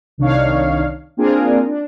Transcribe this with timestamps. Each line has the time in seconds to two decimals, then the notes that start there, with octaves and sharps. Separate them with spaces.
0.18 C2 D#3 D4 D#4 C#5 F5
1.17 A#3 C4 D4 F4 G#4 A#4
1.66 D4